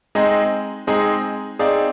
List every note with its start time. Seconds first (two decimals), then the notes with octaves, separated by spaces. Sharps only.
0.15 G#3 C4 D#4 G#4 D#5
0.87 G#3 C4 D#4 G#4 D#5
1.59 C4 D#4 G#4 D5 F5